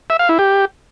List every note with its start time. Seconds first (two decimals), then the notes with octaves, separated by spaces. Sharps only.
0.10 E5
0.19 F5
0.29 E4
0.39 G4